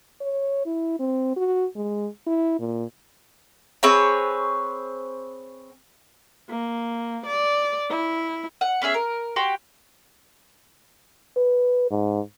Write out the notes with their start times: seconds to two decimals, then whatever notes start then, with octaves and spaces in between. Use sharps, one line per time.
0.21 C#5
0.66 E4
0.99 C4
1.36 F#4
1.76 G#3
2.27 E4
2.60 A#2
3.83 C4 G#4 B4 C#5
6.49 A#3
7.27 D5
7.89 E4
8.61 F#5
8.82 B3 C#4 G#4 E5
8.94 A#4
9.36 F#4 G4 G5 C6
11.37 B4
11.91 G#2